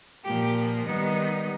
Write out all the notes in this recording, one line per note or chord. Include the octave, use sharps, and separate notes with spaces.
A#2 F3 A#3 G4
D#3 G3 B3 D#4